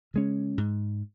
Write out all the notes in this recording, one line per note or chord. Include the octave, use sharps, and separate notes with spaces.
C#3 G#3 C#4
G#2